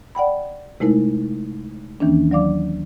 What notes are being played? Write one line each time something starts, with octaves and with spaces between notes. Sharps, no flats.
D5 F#5 G5 B5
C3 G#3 A3 D#4 E4 A#4
D#2 D#3 E3 A#3 C#4 D4
F#3 D5 F5 D6